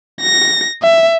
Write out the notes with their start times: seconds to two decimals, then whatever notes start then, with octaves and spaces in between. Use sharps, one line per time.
0.21 A#6
0.83 E5